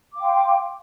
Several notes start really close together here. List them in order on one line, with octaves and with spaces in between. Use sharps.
D6 F5 G5 C6